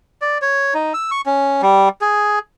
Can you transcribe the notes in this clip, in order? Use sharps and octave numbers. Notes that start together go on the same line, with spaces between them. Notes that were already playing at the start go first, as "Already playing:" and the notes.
D5
C#5
D#4
E6
C#6
C#4
G3
G#4